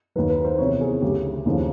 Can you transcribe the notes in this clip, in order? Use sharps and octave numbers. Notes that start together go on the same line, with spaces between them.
D#2 D#3 F#3 B4
B4
C5
E2 C3 E3 C#5
G#4
D2 C#3 F#3 G4
D#2 C#3 F3